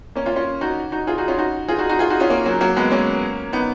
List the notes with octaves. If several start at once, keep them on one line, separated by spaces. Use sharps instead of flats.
A#3 C#4
C#4 F4
C#4 F4
D#4 F#4
D#4 F#4
F4 G#4
D#4 F#4
C#4 F4
D#4 F#4
F4 G#4
D#4 F#4
D#4 F#4
F4 G#4
D#4 F#4
C#4 F4
A#3 C#4
F#3 A#3
F#3 A#3
G#3 B3
A#3 C#4
B3 D#4